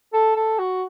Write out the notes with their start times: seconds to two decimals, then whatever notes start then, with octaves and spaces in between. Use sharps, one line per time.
0.13 A4
0.36 A4
0.59 F#4